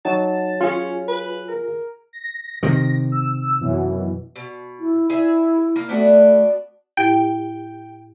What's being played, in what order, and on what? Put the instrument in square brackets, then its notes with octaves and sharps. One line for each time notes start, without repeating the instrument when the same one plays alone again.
[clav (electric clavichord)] F#3 [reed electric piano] D#4 [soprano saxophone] A5
[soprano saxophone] C#4 [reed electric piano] F4 G#4
[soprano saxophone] B4
A#4
[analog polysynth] A#6
[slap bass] C3 D#3
[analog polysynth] E6
F#2 B2 E3
[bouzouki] B2
[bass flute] E4
[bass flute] E4 [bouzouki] G#4 E5
[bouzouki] A#3
[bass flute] A3 [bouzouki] B3 D4 F#4
[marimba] A2 E4 G4 [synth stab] G5